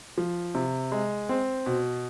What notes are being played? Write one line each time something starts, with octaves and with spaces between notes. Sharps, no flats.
F3
C3
G#3
C4
B2